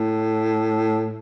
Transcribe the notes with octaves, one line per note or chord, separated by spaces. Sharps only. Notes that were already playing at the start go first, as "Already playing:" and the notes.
Already playing: A2